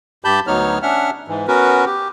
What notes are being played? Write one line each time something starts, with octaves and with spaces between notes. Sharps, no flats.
G2 G4 A5 B5 G6
D2 F#3 B3 D#4 C#5 F6
C#4 D4 E5 F#5 F6
G#2 E3
B3 C#4 F#4 A#4 B4
G4